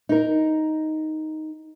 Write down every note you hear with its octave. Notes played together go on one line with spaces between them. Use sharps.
D#4 A#4